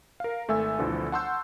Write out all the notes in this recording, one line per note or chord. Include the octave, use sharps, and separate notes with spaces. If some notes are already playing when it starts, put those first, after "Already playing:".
A#4 F5
G#1 A3 A4 E5 G#5 E6
D2 B2 D3 E3 F3 A4
F#5 A5 C6 C#6 E6 G6